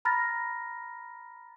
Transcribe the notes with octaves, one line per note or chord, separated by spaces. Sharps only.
A#5 B5 F6 A6 A#6